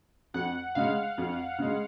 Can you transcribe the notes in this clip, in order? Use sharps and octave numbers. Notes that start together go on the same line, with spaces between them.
F2 F#5
C#3 G#3 F5
F2
C#3 G#3